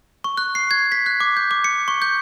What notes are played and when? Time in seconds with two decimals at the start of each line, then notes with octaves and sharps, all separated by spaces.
0.24 C#6
0.37 F#6
0.55 C7
0.71 G#6
0.92 B6
1.06 F#6
1.20 D6
1.37 G6
1.51 D6
1.64 C#7
1.88 C#6
2.02 G6